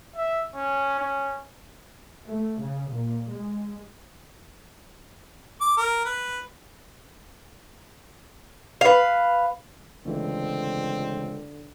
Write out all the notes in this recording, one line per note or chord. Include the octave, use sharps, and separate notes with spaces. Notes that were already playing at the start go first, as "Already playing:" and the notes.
E5
C#4
C#4
A3
C#3
A#2
G#3
D6
A#4
B4
B4 F5
C#2 D3 E3 A3 C4